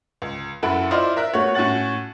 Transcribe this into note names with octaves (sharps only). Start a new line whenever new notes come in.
C#2
F#2 E4 A4 F#5 B5 D7
E4 F4 C5 D5 D#5
A#4 E5 F#6
A3 F#4 C#5
A2 C#4 F#4 F#5 A6 F#7